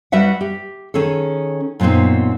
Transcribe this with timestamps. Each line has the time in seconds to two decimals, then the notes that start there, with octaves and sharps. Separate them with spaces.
0.12 G3 F#4 B4 E5 F#5
0.41 G4
0.94 D#3 C#4 G#4 A4
1.80 F#2 A#2 B3 C4 D#4